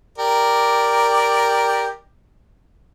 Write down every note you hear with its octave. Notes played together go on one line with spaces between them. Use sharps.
G4 A#4 D5